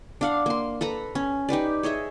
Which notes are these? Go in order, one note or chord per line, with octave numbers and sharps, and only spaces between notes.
D4 F5 F#5
A#3 C6
A4 B4 A#5 B5
C#4
D#4 G4 B4 D5
G#4 C#5 D#5 E5